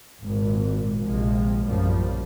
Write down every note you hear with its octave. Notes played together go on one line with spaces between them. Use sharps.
G#1 A#2
A#1 C3 F3 G#3
A#1 F#2 A2 C#3 F3 G3